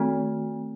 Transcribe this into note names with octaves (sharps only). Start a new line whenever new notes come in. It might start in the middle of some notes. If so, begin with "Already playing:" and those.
Already playing: D#3 A3 C4